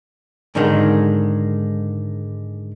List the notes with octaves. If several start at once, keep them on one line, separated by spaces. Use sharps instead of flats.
G#2 D3 D#3 G#3